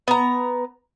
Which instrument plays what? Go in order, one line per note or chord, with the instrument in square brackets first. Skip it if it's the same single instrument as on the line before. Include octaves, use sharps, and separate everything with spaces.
[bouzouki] B3 A#5